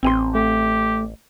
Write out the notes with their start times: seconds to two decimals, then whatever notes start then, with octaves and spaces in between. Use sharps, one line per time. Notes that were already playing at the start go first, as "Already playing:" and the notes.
0.03 A1 C4 G#5 C6
0.35 A3 G4